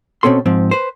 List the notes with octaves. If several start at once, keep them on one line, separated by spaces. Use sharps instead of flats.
B2 C4 C#4 A4 C6
G#2 F3 C4
B4 C5